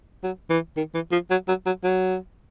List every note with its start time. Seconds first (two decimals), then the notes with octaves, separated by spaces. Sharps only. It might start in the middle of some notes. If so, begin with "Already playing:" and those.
0.23 F#3
0.50 E3
0.77 D#3
0.94 E3
1.12 F3
1.31 F#3
1.48 F#3
1.66 F#3
1.84 F#3